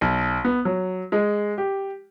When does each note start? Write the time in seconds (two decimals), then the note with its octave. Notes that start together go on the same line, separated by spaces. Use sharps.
0.01 B1
0.45 B3
0.65 F#3
1.12 G#3
1.58 G4